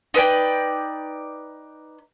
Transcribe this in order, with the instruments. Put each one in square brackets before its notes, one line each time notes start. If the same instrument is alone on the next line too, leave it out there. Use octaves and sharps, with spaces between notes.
[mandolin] D#4 B4 D5 G5